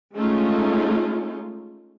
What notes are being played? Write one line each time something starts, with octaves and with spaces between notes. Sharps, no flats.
G#3 A3 C#4 D#4 F4